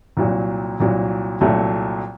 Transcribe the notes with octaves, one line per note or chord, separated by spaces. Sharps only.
C2 A#2 F#3
C2 A#2 F#3
C2 A#2 F#3 A3